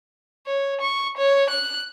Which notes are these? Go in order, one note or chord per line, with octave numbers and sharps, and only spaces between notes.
C#5
C#6
C#5
F#6